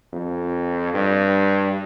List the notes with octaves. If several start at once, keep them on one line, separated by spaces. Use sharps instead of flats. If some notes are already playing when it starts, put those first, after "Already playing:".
F2
G2